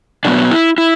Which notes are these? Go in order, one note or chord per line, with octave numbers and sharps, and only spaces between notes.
B2 F#3 B3 D4
E4
E4